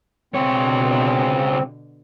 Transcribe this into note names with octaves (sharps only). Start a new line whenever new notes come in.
C#2 B2 D3 C4 C#5